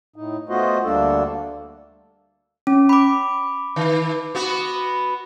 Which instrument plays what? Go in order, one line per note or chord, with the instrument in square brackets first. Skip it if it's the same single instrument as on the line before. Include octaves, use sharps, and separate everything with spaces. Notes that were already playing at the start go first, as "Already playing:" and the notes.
[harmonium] A2 D#4
A3 B3 F4 F#4 C5 D#5
D2 G3 A#3 D4 A4
[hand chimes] C#4
B5 D6
[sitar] D#3
B3 F#4